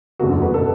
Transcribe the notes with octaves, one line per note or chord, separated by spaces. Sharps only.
F#1 E2 D3 A3 F#4
B4
B2 B3 A4